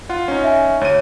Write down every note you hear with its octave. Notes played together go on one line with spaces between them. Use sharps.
F4 F#5
C#4 D#4
E5 G#5
D2 C#5 D#7